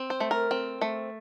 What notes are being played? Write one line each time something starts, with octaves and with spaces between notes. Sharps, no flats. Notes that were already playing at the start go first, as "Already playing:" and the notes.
Already playing: C4
C5
A3
A#4
C4
A3